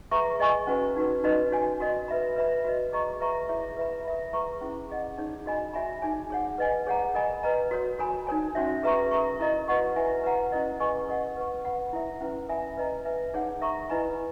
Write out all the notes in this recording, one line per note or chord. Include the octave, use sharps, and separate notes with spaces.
G#4 B4 E5 A#5 C#6
G#4 D#5 G#5 C#6
C#4 F#4 B4
D#4 F#4 B4
D#4 F#4 B4 D#5
F#4 C#5 G#5
F#4 A#4 D#5
B4 E5 B5
B4 E5 B5
F#4 B4 D#5
G#4 D#5 A#5 C#6
B4 E5 A#5 C#6
E4 G#4 C#5 E5
B4 E5 B5
A#4 E5 B5
G#4 B4 E5 A#5 C#6
C#4 E4 G#4
G#4 D#5 F#5
D#4 G#4 C#5
F#4 A#4 D#5 G#5 B5
F#4 C#5 E5 G#5 B5
D#4 G#4 C#5 G#5
G#4 C#5 F#5
B4 D#5 G#5
G#4 C#5 F#5 A#5
A#4 D#5 G#5 B5
B4 D#5 A#5
F#4 A#4 C#5
F#4 A#4 C#5 G#5 B5
D#4 A#4 C#5 G#5
C#4 F#4 C#5 E5
G#4 B4 E5 A#5 C#6
A#4 E5 A#5 C#6
E4 A#4 D#5 A#5
F#4 B4 D#5 F#5 C#6
E4 B4 E5 G#5
B4 F#5 A#5
C#4 E4 A#4 D#5
G#4 B4 D#5 G#5 C#6
A#4 D#5 F#5
B4 F#5 C#6
B4 F#5 B5
E4 A#4 E5
C#4 E4 B4
A#4 E5 G#5 B5
B4 D#5 A#5
B4 E5 G#5
D#4 G#4 C#5 F#5
A#4 E5 A#5 C#6
E4 B4 D#5 G#5 B5